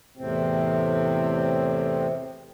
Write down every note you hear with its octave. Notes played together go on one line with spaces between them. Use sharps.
E2 A2 C3 C4